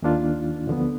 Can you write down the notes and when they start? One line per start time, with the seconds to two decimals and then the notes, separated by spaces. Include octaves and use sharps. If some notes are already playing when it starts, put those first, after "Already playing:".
0.02 D#2 D#3 A#3 D4 F4
0.67 D2 D3 F3 B3